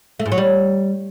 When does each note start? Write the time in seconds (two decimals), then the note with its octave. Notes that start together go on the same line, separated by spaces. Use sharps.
0.20 A3
0.26 G#2
0.32 F#3
0.38 G3